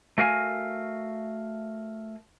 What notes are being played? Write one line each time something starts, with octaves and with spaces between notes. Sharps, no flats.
A3 F#4 A#4 F5 G#5